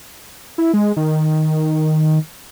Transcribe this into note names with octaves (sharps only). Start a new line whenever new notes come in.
E4
G#3
D#3